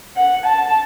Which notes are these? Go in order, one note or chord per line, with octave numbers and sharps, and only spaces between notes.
F#5
A5